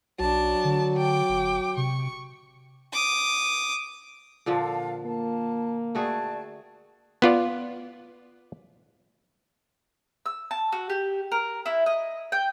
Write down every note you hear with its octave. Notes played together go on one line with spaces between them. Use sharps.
B1 F#3 D4 A5
D3
G5 D6
G1
C3 C#6
D6 D#6
A#2 D3 F3 A4 F5
A#3 A5
A3 F#4 G#4 D5 G5 A5
B3 F4 D5
E6
A5
F#4
G4
A#4
E4
D#5
G5